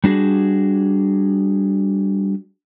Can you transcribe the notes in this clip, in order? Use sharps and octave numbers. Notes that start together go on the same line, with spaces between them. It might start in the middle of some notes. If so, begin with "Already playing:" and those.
G3 D4 F#4 G#4